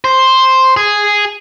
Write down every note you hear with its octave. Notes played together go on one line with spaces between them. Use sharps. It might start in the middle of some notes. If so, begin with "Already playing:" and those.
C5
G#4